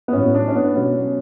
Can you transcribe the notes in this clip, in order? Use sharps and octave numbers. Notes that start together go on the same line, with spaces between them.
B3
A2 F#3 C#4
D4
C#4
B3
B2 F#3 C#4